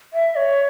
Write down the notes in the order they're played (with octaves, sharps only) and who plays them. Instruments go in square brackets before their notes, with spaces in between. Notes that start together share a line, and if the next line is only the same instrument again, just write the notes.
[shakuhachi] E5
C#5